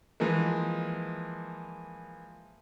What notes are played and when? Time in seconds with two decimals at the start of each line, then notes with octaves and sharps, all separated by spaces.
0.20 E3 F3 G#3 A#3